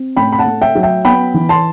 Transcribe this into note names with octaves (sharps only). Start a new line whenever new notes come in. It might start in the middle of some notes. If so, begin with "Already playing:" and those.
Already playing: C4
A2 G5 B5
B5
F#5 A5
A3
E5 G5
F#3
E5 G5
B3 G5 B5
E3
A5 C6